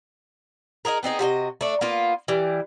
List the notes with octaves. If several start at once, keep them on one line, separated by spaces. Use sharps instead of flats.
D#4 F#4 G#4 A#4
B3 C4 D#4 G#4
C3 F#4 G#4 D#5
A3 D4
A#3 B3 F4
E3 G3